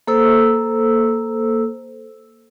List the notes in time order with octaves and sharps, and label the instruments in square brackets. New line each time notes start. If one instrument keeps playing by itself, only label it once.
[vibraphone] A#3 A4 C5 E6